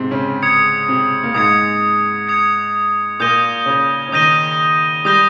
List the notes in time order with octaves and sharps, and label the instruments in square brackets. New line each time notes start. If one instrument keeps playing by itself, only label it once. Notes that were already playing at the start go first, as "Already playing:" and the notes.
Already playing: [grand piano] G#2 C3 G#3 C4
C#3 C#4
[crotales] D#6 G#6 C#7
[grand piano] C3 C4
A#3
[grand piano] G#2 G#3 [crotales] D#6 G#6 C#7
[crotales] D#6 G#6 C#7
[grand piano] A#2 A#3 [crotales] D#6 G6 A#6 D#7 G7
[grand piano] C#3 C#4
C#4
[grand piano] D#3 D#4 [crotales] D#6 G6 A#6 D#7 G7
[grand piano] G3 G4 [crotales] D#6 G6 A#6 D#7 G7